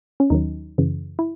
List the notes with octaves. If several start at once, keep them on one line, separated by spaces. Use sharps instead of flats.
C#4
D#2 D#3 F#3 D#4
F#2 C#3 E3
E4